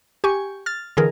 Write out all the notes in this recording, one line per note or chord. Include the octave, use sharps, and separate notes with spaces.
G4 G#5 C#6
F6 A6
D3 E3 G#4 A#4